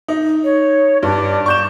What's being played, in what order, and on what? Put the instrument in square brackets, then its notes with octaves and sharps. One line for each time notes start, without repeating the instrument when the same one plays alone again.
[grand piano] D#4
[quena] C#5
[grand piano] G2 [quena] D5
[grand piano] C#6 G6 E7